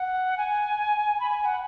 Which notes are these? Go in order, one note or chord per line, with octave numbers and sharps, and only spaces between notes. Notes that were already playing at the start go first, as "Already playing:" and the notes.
Already playing: F#5
G#5
B5
G#5
F#5